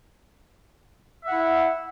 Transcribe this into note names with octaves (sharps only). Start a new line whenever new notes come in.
E4 E5 F#5